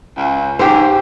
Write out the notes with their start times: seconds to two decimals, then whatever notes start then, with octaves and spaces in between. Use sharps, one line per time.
0.17 C#2
0.59 G#2 G4 C5